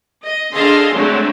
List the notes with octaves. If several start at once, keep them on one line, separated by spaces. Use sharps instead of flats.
D#5
D3 G#4 A4 D#5 F5 C6
D3 F#3 G#3 A3 C4